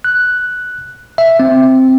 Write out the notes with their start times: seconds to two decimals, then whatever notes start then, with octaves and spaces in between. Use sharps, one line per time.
0.04 F#6
1.18 E5
1.40 C4